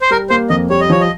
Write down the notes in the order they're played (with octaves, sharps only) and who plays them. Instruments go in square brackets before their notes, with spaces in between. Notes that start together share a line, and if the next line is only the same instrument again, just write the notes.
[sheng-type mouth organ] C5
[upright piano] G3 [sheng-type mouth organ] A#4
[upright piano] A#3 [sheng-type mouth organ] C5
[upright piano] F2 [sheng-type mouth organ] D#5
[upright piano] G3 [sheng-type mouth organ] C#5
[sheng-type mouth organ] D#5
[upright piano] F3 [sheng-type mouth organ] C#5
[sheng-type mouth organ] D#5